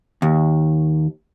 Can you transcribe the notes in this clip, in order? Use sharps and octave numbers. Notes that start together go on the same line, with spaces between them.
D#2